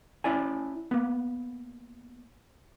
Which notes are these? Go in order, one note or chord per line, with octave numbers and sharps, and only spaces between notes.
C#4 E4 D5 G#5
A#3 B3